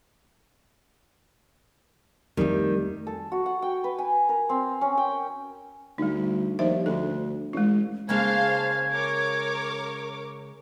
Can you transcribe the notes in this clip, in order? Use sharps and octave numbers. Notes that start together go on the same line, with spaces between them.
F2 D#3 G3 A3
A4
F#4
F#5
G5
B4
G#5
A#4
C4
C#4
G5
D2 G3 D#4
D#2 F3 C5 E5
D2 D4 A4
A1 G#3 E4
C#3 G#3 A#3 C5 F5 A5 G#6
A#4 C#5 D6